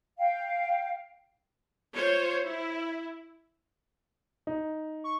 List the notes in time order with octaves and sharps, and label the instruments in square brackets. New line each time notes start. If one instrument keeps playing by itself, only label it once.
[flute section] F5 G5
[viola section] F4 C5 C#5
E4
[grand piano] D#4
[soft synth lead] C#6